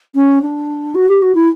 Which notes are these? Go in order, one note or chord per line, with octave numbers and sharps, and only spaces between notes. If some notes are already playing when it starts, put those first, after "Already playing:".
C#4
D4
F#4
G4
F#4
E4